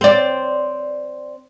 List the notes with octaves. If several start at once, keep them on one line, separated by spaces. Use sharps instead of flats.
C4 D5